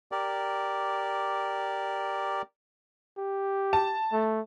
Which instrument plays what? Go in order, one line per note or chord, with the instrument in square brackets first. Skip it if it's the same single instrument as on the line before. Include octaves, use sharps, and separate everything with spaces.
[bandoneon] G4 A#4 D5
[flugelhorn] G4
[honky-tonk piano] A5
[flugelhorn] A3